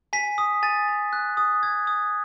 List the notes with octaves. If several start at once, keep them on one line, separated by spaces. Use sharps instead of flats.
G#5 B6
D#6
G#5 A6
G#5
F#6
D#6
D#6 G#6
D#6